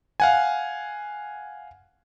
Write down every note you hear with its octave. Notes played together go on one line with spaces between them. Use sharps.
F5 F#5 G#5